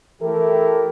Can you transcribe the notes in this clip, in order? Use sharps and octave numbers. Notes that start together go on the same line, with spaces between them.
E3 A3 E4 G4 A4 A#4